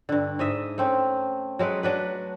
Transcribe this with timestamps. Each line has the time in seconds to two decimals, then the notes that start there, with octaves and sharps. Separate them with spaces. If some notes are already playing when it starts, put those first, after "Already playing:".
0.09 G2 D3
0.39 G#2 D#5 E5
0.78 A3 C4 C#4
1.59 F#3 G#3 A3 B4
1.83 F#3 D4 B4